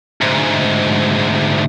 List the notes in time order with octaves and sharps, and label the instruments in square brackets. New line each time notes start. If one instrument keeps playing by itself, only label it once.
[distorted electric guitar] D2 G#2